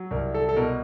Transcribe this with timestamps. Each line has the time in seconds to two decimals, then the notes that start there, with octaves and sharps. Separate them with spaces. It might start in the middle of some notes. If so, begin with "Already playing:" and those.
Already playing: F#3
0.11 C2 A#4
0.34 A4
0.49 A4
0.56 B2 A#4